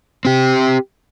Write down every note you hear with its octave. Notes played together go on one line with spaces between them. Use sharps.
C4 G4